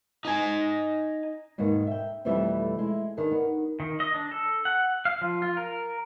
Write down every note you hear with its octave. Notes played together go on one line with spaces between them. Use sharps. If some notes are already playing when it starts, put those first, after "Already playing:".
D#4 G#5
D#2 G#2 B2 D#3
E5 G5
F2 B2 E3 G3 A3 E5
G#3 E4
D#3 D4 G#4 B4
B3
D#3
D#5
D4
A4
F#5
F5
F3
F4
A#4